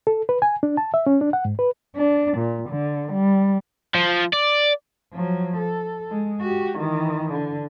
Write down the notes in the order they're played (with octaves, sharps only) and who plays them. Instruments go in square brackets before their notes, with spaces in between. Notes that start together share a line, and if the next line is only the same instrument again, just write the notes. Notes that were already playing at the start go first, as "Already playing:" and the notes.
[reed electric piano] A4
B4
G#5
D4
A5
E5
C#4
D4
F#5
G#2
B4
[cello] D4
A#2
D3
G3
[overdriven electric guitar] F3
D5
[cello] F3 F#3
A4
G#3
F#4 G4
D#3 E3
D3